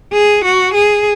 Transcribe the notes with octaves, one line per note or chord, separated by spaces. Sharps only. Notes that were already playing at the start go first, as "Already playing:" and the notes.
G#4
F#4
G#4